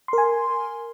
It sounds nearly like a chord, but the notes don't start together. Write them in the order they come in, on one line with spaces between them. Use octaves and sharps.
C6 A#4 G#5